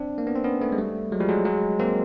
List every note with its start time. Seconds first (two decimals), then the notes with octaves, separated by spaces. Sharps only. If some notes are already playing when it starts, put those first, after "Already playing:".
Already playing: C4 D4
0.18 A#3
0.27 B3
0.35 C4
0.44 B3 C#4
0.61 A3 B3
0.72 G#3
0.78 G3 A3
1.12 F#3 G#3
1.20 F3 G3
1.29 F#3 G#3
1.45 F#3 G#3
1.80 A#3 C4